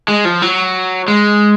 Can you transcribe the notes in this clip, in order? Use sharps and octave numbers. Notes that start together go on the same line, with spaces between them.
G#3
F3
F#3
G#3